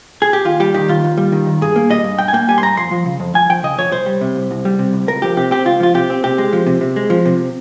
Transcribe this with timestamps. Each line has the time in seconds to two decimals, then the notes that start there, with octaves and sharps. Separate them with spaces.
0.22 G#4
0.33 G4
0.45 D#2 F4
0.60 G3 G4
0.74 D#3 G4
0.88 D#2 F4
1.04 D#2
1.17 G3
1.32 D#3
1.47 D#2
1.61 G2 G#4
1.76 A#3
1.90 G3 D#5
2.04 G2
2.19 G2 G5
2.28 G#5
2.33 A#3 G5
2.48 G3 G#5
2.58 C6
2.62 G2 A#5
2.76 F2 C6
2.91 F3
3.06 C#3
3.20 F2
3.34 F2 G#5
3.50 F3 G5
3.63 C#3 D#5
3.78 F2 C#5
3.92 C2 C5
4.06 G3
4.21 C3
4.36 C2
4.51 C2
4.65 G3
4.79 C3
4.93 C2
5.08 C#2 A#4
5.22 F3 G4
5.37 C3 G4
5.51 C4 G4
5.65 C#2 F4
5.80 F3 F4
5.94 C3 G4
6.10 C4
6.24 C3 G4
6.38 G#3
6.53 F3
6.66 C3
6.81 C3
6.96 G#3
7.10 F3
7.26 C3